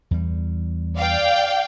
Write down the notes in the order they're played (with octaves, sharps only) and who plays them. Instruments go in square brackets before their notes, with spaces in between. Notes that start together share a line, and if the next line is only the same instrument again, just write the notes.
[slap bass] E2 G3
[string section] D5 F5 G5